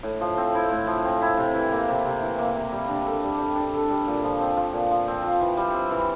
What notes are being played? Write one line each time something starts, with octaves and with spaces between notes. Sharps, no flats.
A2
F3
C4
E4
A2
F3
C4
E4
C3
E3
A#3
C3
C3
E3
A#3
C3
G3
D4
A4
G3
G3
D4
A4
G3
A#2
F3
C4
F4
A#2
F3
C4
F4
E3
G3
C4
E3